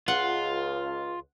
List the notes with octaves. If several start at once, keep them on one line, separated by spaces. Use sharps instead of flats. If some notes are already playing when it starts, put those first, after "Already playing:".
C#2 F4 F#5